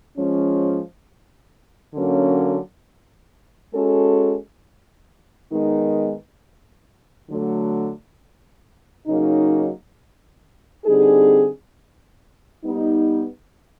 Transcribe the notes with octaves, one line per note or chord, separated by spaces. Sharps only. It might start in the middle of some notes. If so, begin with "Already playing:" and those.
F3 G#3 C#4
D3 F#3 A#3 C#4
G#3 C#4 F#4 A4
D#3 G#3 B3 D#4
D3 F#3 A3
C#3 F#3 A#3 D#4
D3 G3 C4 D#4 G#4
G3 B3 D#4